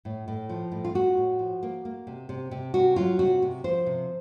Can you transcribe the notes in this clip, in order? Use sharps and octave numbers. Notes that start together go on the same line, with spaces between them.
A2
A2
F3
A2
F4
A2 F#4
A2
F3
A#3
A#3
C3
C3
C3
C3 F#4
F#3 F4
C3 F#4
C3
F3 C5
C3